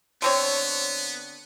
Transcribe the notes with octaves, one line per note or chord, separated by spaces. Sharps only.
D3 B3 C4 C#5